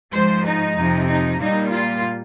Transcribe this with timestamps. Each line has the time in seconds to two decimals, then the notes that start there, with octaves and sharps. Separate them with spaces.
0.11 G#2 F3 G#3 C5
0.44 D#4
0.76 F2 C3 F3
1.08 D#4
1.40 A#2 G3 A#3 D#4
1.72 F4